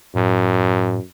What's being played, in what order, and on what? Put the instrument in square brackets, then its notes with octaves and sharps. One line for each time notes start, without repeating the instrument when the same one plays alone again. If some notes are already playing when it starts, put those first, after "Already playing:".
[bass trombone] F#2 [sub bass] A2